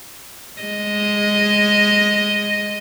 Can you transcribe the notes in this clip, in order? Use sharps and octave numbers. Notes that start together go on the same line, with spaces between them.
G#3 D#5